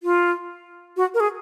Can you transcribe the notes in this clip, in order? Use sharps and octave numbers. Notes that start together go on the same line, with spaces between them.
F4
F#4
A#4
G#4